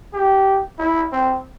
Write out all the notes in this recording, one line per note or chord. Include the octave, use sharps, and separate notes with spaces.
G4
E4
C4